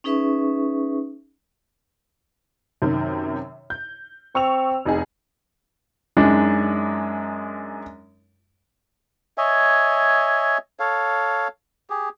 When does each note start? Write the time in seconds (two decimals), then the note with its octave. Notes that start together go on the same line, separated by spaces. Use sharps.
0.04 C#4 D#4 G#4 B4 E5 C#6
2.82 F#2 C3 D#3
3.70 G6
4.35 C4 C#6 E6 F7
4.85 F1 D#4 G#4
6.17 F#2 G#3 D4 D#4
9.38 C#5 D#5 E5 G#5
10.80 A4 C#5 F5
11.90 G4 G#4